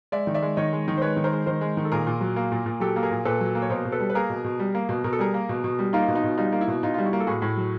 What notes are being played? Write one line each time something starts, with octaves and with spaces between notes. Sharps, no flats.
G#3 D5 E5
D#3
D5 E5
G#3
D#3 C#5 D#5
G#3
D#3
C5
G#3 B4 C#5
D#3
A#4 C5
G#3
D#3 A#4 C5
G#3
D#3
A4
A#2 G#4 A#4
A#2
F#3
A#3
A#2
A#2
F#3 G4 A4
A#3
G#4 A#4
A#2
A#2 A4 B4
F#3
A#3
C#5
B2 A#4 C5
B2
A4 B4
G3
B4
A#3 G#4 A#4
B2
B2
G3
A#3
B2
B2 A#4
A4
G3 G#4 A#4
A#3
B2
B2
G3
A#3 D#4 F4
B2
D#4 F4
B2
G3 D#4 F4
A#3 F4
E4
B2
B2 D#4 F4
G3 F4
E4 F#4
A#3
A4
A2 F#4 G#4
A2
F#3